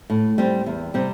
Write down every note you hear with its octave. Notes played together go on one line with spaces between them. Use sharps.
A2
G3 C4
E2
C3 G3 C4